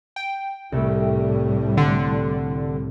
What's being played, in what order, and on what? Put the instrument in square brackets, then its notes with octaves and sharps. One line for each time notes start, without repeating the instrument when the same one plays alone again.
[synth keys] G5
[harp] C2 A3 [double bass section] A2 G3
[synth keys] D3 [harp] C6